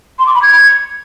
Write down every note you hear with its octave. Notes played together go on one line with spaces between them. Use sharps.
C6
D6
B5
G#6